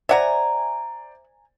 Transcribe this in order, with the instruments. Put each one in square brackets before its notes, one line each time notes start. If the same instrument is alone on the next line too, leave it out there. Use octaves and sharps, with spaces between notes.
[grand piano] C5 D5 [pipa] E5 F#5 [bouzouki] G#5 A#5